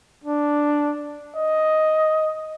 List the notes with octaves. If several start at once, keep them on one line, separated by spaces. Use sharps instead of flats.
D4
D#5